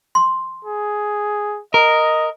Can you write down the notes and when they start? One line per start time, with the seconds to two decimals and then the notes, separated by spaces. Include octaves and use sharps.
0.15 C6
0.65 G#4
1.74 A#4 D#5